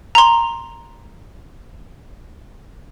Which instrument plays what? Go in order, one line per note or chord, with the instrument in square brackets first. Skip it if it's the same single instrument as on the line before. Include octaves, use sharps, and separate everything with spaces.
[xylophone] A#5 C6